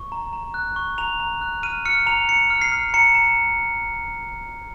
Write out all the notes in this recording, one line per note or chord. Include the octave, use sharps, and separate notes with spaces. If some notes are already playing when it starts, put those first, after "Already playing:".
Already playing: C#6
A#5
A#5
F#6
C#6
A#5 F7
A#5
F#6
F6 D#7
F6 C#7
A#5 F7
A#5 C#7
F6
C7
F6
A#5 C#7
A#5